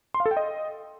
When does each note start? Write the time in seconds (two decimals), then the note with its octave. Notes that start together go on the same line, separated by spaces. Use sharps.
0.14 C6
0.20 F5
0.26 A4
0.31 G5
0.37 D#5